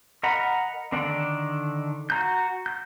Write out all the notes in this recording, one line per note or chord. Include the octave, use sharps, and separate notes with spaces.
A#4 D#5 F#5 A#5 B5
D3 D#3 D4 A4 D5
F#4 A#5 G6
G6